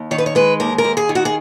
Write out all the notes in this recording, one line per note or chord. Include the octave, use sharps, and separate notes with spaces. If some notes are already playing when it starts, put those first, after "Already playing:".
Already playing: D#2
D#3 C#5
B4
C#5
G#3 B4
D#2 A#4
A#4
D#2
G#4
D#3
F#4
G#4